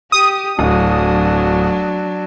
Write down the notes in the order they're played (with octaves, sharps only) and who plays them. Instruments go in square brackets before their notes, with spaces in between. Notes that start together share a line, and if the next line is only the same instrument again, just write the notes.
[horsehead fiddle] G4 [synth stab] D#6
[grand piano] D1 [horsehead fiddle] F#3 D4